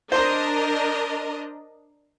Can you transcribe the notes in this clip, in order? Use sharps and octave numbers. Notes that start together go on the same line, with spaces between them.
D4 A#4 C5 D#5